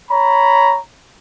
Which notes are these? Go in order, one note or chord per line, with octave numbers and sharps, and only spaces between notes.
C#5 A#5 B5